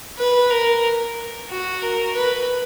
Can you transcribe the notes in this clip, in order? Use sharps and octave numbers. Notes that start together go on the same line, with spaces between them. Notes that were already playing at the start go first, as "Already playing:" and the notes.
B4
A#4
F#4
A#4
B4